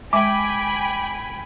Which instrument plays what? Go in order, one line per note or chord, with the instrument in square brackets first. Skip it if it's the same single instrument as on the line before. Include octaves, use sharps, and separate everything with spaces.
[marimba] G#3 E5 [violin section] G5 G#5 B5 [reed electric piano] D6